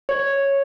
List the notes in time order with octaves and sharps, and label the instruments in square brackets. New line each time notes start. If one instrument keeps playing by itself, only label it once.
[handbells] C#5